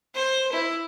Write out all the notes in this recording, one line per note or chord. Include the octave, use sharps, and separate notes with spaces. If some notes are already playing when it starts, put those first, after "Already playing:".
C5
E4